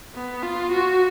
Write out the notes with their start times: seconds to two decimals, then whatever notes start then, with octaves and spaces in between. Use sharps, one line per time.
0.15 B3
0.43 F4
0.72 F#4